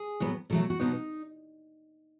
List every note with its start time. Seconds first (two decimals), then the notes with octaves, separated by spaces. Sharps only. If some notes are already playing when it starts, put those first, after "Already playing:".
Already playing: G#4
0.20 A2 F#3 B3
0.50 B2 F#3 A3 A4
0.70 F#4
0.79 B2 F#3 B3 D#4